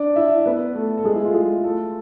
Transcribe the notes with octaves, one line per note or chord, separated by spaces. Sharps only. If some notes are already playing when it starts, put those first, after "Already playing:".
Already playing: D4 D5
E4 E5
B3 B4
A3 A4
A4
G#3 G#4
E4
F4
G#3 G#4
A3 A4